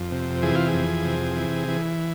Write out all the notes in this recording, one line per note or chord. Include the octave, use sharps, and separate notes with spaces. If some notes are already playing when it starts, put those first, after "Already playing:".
Already playing: F2
C3
E3 G#4
F4
G#4
F2
C3
E3
E3